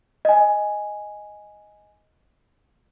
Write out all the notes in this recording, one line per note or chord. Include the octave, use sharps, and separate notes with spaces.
D#5 G#5